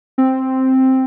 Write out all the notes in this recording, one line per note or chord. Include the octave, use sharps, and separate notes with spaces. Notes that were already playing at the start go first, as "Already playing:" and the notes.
C4